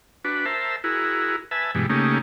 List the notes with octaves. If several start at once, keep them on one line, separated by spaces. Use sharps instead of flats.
D4 F#4 B4
A#4 C5 E5 A5
E4 F#4 G#4 A#4
B4 E5 G#5 A5
G2 B2 E3 G#3
C#3 A3 A#3 C#4 D#4 G4